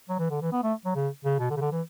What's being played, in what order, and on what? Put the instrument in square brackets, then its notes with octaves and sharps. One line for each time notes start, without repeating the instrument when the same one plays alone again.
[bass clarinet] F#3
E3
D3
E3
B3
A3
F#3
C#3
C#3
B2
D3
C#3
D3
E3